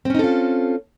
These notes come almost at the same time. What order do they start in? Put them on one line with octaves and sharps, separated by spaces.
C4 C#4 D#4 A4 F4